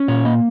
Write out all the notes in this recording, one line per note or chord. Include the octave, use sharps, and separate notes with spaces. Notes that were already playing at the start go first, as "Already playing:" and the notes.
Already playing: C#4
A#2 C#5
A#3 D#5